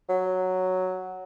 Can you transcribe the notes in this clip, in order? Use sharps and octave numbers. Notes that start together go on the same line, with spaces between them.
F#3